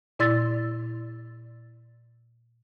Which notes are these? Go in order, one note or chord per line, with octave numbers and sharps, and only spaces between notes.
A#2 E4 D5 C6 E6 A6